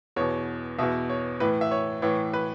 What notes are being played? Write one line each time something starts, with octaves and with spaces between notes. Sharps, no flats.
E2 B2 C#5
E2 B2 E5
C#5
A2 E3 B4
E5
C#5
A2 E3 C#5
B4